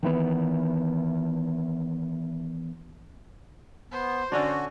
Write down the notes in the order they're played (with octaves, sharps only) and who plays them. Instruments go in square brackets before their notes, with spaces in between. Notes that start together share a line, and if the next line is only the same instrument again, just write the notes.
[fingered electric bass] D#3 E3 B3
[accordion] B3 [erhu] C5
[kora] D3 C#4 D4 [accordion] F#4